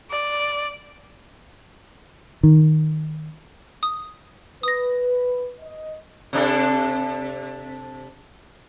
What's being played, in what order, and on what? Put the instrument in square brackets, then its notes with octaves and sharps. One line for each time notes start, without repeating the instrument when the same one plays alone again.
[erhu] D5
[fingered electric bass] D#3
[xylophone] D#6
[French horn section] B4 [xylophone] D#6 A#6
[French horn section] D#5
[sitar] C3 D4 A4